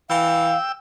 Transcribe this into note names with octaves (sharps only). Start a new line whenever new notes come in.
E3 F5 G5 E6